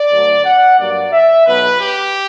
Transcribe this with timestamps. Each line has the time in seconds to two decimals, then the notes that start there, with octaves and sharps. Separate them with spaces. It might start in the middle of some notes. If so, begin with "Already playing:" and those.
Already playing: D5
0.11 D2 D3 F#3
0.45 F#5
0.78 G2 F#3 A#3 D5
1.12 E5
1.46 B1 B2 F#3 B3 B4
1.80 G4